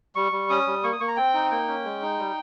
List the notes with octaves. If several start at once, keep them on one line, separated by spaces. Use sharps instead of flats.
G3 C#6
G3
C#4 D#6
G3
A#3 C#6
D#6
A#3 C#6
A#5
C4 G5
D#4
A#3 G5
C#4
G#3
D#4
G3